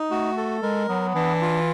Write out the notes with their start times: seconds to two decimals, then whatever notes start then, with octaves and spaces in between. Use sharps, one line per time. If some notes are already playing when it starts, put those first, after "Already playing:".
Already playing: D#4
0.11 A3 F#4
0.37 A4
0.62 G#3 A#4
0.89 F#3 B3
1.15 E3 D4
1.42 F4